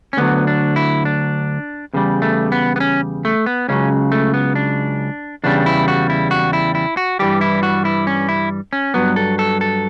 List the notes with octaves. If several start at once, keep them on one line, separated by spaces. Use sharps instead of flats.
C#4
D2 D3 F#3 B3
D4
E4
D4
E2 C#3 G3
A3
B3
B3
C#4
A3
B3
C#2 C#3 F#3 C#4
A3
B3
D4
E2 C#3 G3 D4
E4
F#4
E4
F#4
E4
E4
F#4
G2 E3 G3 G4
E4
F#4
E4
C#4
E4
C#4
G2 F#3 B3
A4
A4
A4